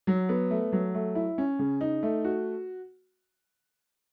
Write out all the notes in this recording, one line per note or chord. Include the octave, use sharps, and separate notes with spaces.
F#3
B3
A3
F#3
A3
E4
C#4
C#3
D#4
A3
F#4